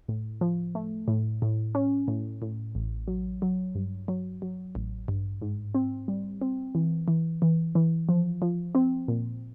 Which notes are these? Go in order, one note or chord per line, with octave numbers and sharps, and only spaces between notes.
A2
F3
A3
A2
A2
C#4
A2
A2
A1
F#3
F#3
G2
F#3
F#3
A1
G2
G#2
C4
G3
C4
E3
E3
E3
E3
F3
F3
C4
A#2